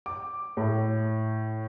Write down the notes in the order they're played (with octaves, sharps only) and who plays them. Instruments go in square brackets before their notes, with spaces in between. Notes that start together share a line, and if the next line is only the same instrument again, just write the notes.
[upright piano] D6
A2